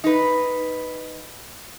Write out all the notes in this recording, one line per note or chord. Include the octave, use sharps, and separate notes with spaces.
D#4 B4